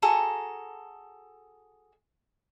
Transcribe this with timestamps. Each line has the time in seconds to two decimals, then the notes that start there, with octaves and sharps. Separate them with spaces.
0.02 F#4 G#4 A4 A#5